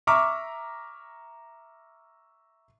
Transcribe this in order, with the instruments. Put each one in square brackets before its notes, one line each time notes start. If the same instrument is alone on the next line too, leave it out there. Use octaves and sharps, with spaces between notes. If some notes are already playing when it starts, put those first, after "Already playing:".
[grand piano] E5 A#5 C#6 D6 F6